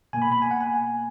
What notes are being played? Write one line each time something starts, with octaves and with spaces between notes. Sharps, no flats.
B2 A#3 G#5
B5
B5
G#5
F#5
G#5